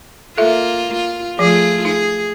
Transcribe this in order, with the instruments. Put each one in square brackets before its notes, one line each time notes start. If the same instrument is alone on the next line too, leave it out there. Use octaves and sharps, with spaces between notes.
[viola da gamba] A#3 F4 [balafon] A4 E5
[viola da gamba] F4
[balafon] F3 [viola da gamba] A3 F4 G#4
[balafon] D#4 [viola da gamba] G#4